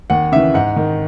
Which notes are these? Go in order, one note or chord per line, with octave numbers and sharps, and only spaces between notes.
D#2 F#5
C#3 E3 E5
G#2 F#5
D#3